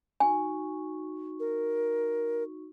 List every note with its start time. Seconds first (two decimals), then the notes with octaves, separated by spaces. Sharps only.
0.20 D#4 F#4 G#5 C#6
1.40 A#4